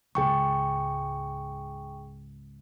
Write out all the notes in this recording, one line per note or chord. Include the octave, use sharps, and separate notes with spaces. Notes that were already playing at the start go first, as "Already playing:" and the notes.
C#2 G#2 G#4 G5 C#6